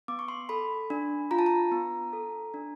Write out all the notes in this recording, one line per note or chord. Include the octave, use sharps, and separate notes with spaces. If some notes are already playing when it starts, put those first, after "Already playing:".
B3 D6
C#6
C6
A4 B5
D4
F4 A#5
A5
A#5
B3
A4
D4